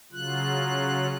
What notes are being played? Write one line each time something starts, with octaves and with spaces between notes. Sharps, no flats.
C#3 F#3 F4 F#6